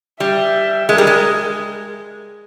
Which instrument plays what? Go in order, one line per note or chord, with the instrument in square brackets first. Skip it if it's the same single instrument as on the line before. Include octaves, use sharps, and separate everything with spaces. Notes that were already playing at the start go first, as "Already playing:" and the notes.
[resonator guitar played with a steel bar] G3 [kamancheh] E5
[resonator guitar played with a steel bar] G#3 [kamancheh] A#4
[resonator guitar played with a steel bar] G3
G#3